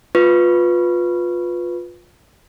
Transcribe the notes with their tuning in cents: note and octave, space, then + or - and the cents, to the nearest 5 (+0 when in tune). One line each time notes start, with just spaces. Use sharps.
F4 +20 B4 +0 C#6 +0